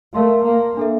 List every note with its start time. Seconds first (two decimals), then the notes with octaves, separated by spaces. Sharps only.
0.14 A3 A#4 D5 F5 A5 C6
0.46 A#3
0.77 D4 A4 E5